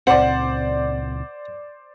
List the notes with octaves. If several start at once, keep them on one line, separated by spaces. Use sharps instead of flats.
C#2 A#2 C4 C5 D5 F#5